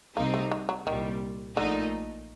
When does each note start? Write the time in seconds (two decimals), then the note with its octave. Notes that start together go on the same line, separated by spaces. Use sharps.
0.16 C2 C3 G3 A#3 C4 D#4
0.34 A3
0.52 D#3
0.69 F#3
0.87 C2 A#2 D#3 G3
1.57 A#1 A#2 D3 A3 D#4